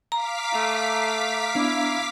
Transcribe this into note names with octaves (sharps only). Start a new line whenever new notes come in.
F5 A#5 D6 B6
A3
B3 D4 E4